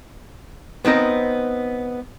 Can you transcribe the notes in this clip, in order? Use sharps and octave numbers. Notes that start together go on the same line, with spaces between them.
B3 C4 D#4 A#4